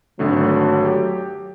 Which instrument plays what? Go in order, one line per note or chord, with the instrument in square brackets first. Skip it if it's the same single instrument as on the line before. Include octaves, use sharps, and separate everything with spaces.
[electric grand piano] G#1 D3 A3 [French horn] F#3
[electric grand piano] G4